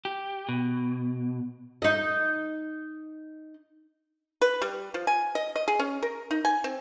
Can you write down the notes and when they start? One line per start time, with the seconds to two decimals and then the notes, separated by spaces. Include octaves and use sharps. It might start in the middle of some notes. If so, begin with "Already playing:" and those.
0.05 G4
0.49 B2
1.82 D#4 D#5
4.41 B4
4.62 G3
4.94 F3
5.07 G#5
5.35 D#5
5.56 D#5
5.68 G#4
5.79 C#4
6.03 A#4
6.31 D#4
6.45 G#5
6.64 C4